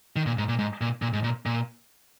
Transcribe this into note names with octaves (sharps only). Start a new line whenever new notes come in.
D#3
A#2
G#2
A#2
G#2
A#2
A#2
G#2
A#2
A#2